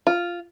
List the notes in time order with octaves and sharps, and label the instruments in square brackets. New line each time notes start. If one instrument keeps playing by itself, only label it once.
[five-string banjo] F4